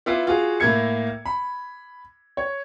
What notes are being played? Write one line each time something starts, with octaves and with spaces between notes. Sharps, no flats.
B3 E4 F4 D6 C7
F4 F#4 G#4 F5
A2 A#3 A#4 E5 G#6 C#7
B5
C#5